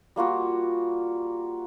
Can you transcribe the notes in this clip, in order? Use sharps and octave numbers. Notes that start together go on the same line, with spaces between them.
G3 A#3 F4 F#4